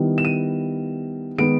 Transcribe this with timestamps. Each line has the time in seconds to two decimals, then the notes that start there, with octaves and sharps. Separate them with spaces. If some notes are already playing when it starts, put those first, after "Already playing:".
Already playing: D#3 G3 B3 E4
0.18 E7
0.25 D#7
1.38 D#3 G#3 B3 D7